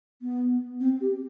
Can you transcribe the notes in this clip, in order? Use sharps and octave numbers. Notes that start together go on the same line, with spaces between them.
B3
C4
G4